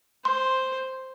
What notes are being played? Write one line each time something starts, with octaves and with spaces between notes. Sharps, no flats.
C5 C6